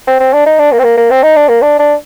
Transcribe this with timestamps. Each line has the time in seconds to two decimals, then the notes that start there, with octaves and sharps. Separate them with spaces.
0.07 C4
0.20 C4
0.33 D4
0.46 D#4
0.59 D4
0.72 A#3
0.79 C4
0.84 A#3
0.97 A#3
1.11 C4
1.23 D#4
1.36 D4
1.49 A#3
1.62 D4
1.79 D4